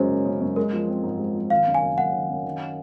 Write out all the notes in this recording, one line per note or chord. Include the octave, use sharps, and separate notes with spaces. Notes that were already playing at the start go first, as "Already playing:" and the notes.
Already playing: F#2 C#3 F#3 G#3 C5
F#1
C#3
F#2
G#3 A#4
F3
C4
G#2
G#3
F3
D#3 F5
F#2
G#5
F#1
F#1 F#5
D#3
F#2
D#3